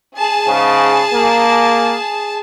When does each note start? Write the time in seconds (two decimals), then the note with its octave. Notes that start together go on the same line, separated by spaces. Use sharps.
0.16 G#4 A5
0.46 G#2 C#3
1.13 A#3